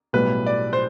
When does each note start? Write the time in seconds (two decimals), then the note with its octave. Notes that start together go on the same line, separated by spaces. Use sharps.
0.13 B1 A2 G3 B4
0.46 D5
0.73 C5